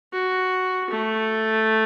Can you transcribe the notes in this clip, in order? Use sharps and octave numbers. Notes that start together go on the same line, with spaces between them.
F#4
A3